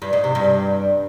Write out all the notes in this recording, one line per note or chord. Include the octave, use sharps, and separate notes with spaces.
G2
G#2
C3
G2